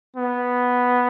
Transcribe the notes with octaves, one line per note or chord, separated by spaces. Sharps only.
B3